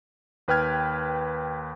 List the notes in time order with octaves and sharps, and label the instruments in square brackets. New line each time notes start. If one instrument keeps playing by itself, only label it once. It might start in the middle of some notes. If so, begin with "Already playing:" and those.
[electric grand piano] D#2 B4 G5 F6 G#6